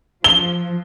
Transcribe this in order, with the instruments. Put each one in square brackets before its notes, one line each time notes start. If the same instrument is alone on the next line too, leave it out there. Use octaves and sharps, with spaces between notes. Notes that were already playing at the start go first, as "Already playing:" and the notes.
[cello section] F3 [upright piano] G7